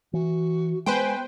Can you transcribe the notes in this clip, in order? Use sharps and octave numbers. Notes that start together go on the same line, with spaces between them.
E3 F#4
G#3 B3 B4 C5 G5 G#5